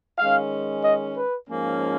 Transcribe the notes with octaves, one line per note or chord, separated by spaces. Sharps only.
D#3 G#3 C#4 F5
D#5
B4
G#2 F3 A#3 C#4